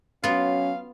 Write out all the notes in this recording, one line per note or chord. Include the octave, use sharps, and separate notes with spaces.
F#3 B3 C#4 F4 F5